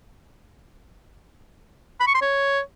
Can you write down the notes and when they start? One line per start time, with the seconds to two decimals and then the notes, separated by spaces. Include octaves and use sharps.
2.00 B5
2.07 C#6
2.14 C6
2.22 C#5